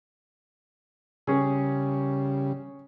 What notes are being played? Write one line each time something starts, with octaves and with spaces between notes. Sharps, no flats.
C#3 G3 C#4 G#4